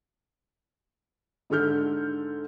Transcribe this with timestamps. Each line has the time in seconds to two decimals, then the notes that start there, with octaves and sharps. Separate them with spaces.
1.50 G#2 D3 A4 F6 G6